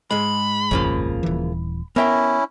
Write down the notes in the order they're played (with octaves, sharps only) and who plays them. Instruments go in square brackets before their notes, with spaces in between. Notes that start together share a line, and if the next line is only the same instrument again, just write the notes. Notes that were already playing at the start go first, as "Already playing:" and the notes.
[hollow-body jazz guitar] G#2 G#3 [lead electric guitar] B5
[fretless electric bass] D#1 G#1 F2 [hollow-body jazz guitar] C#3 F3 A#3
[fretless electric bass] D#1 E3
[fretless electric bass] B3 [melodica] C#4 E4 [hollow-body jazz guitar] A#4 E5 G5